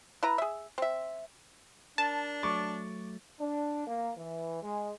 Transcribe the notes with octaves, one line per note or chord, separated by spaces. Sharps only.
E4 B4 E5 A#5
G#4 E5
C4 E5
D4 A#4 A5
F#3 A3 C#6 D6 A6
D4
A#3
E3
G#3